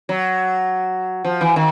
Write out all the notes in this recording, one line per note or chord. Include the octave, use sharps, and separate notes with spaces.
F#3
F3
E3
D#3